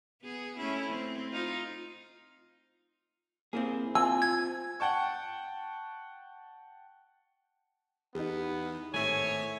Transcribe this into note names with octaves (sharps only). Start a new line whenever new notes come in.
B3 G#4
A3 C#4 E4
C4
D#4 F4
A#3 C4 E4 G#4
C4 F4 G#5 E6
G#6
F#5 G5 A5 C#6
E2 B3 D#4 G4
G#1 A2 C#5 E5 G#5